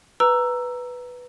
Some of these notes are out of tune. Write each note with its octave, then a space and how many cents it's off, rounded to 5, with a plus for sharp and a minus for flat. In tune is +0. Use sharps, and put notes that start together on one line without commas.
B4 +0 A#5 +0 E6 +10